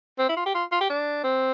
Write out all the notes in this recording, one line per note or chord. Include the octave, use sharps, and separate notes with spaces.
C4
E4
F4
G4
F4
F4
G4
D4
C4